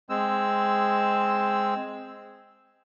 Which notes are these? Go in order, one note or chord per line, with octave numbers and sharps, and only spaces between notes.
G#3 C4 E6